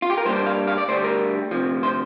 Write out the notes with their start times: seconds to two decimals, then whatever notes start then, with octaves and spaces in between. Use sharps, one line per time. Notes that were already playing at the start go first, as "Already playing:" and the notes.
0.02 F4
0.10 G4
0.18 A#4
0.25 G2 G3 A#3 D4 C5
0.36 C5
0.46 F5
0.67 F5
0.78 D5
0.88 D2 D3 G3 C5
1.04 A#4
1.51 D2 C3 F3
1.83 C5